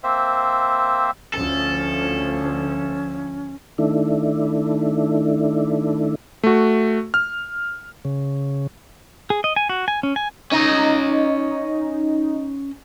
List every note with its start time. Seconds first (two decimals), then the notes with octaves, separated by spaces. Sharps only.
0.03 A#3 C4 C5 E5
1.34 D2 F3 C#4 A4
3.78 D#3 A3 D4 E4
6.44 A3 F#4
7.14 F6
8.05 C#3
9.30 G#4
9.44 D#5
9.56 G#5
9.69 F#4
9.88 G#5
10.03 C#4
10.16 G#5
10.52 C#4 D#4 D#5